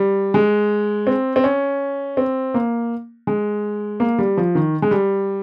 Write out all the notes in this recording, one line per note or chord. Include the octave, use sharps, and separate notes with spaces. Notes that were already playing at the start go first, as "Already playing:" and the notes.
Already playing: G3
G#3
C4
C4
C#4
C4
A#3
G#3
A#3
G3
F3
D#3
G#3
G3